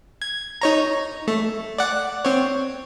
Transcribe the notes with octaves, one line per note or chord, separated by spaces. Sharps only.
G#6
D#4 C#5 A#5
A3
D5 F#5
C4 C#5